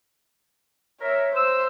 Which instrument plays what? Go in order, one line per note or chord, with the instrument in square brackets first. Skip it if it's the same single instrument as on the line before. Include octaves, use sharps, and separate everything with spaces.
[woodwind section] A#4 E5 [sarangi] C#5
[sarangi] C5 [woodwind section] E6